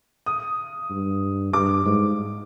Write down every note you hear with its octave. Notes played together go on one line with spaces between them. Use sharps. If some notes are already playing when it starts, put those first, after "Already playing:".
D#6
G2
G2 D6
G#2